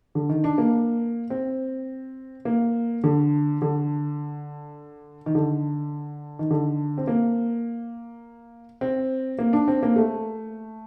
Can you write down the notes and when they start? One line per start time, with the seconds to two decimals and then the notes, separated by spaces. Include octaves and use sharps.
0.15 D3
0.29 D#3
0.44 D4
0.58 A#3
1.30 C4
2.45 A#3
3.04 D3
3.62 D3
5.26 D#3
5.35 D3
6.39 D#3
6.51 D3
6.98 C4
7.07 A#3
8.81 C4
9.39 A#3
9.53 D4
9.68 C4
9.83 A#3
9.96 A3